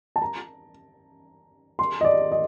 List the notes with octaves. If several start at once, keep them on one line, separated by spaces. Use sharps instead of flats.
A5
A#5
C6
D#5
D5
D#5